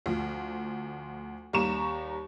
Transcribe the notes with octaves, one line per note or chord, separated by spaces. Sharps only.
D2 F3
D#2 G3 A#5 C#6 E7